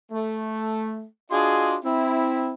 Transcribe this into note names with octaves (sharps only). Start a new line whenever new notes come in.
A3
D4 F4 F#4 G#4 D#5 C6
C4 E4